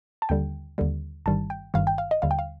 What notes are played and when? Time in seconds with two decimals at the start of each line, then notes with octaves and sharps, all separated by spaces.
0.22 A5
0.29 D#2 D3 G3 G5
0.78 D#2 D3 G3
1.26 G1 G2 D#3 G3 A5
1.50 G5
1.74 G1 G2 D#3 G3 F5
1.87 G5
1.98 F5
2.11 D#5
2.22 D#2 D3 G3 F5
2.31 G5
2.39 F5